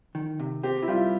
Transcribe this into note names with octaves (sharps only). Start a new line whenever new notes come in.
D#3
C3
C4 G4
E4
G3 F4